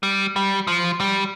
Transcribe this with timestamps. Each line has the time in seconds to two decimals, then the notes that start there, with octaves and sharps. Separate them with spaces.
0.03 G3
0.36 G3
0.67 F3
1.00 G3